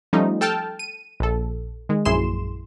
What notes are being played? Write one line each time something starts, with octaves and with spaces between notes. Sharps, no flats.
F3 G3 A3 C#4 D#4
A4 G5 A5 F6
D#7
A#1 A4
D#3 G#3
A#1 F#2 E4 G#4 C6 E7